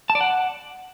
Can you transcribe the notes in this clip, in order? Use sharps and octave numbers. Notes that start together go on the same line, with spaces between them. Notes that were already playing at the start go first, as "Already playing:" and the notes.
A5
D5
F#5